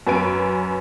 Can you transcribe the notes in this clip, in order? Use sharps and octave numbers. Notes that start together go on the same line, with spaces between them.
F#2 B4 G#5 D7